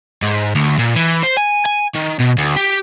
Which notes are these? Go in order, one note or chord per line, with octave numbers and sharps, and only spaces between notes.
G#2
D2
A#2
E3
C5
G#5
G#5
D#3
B2
D2
G4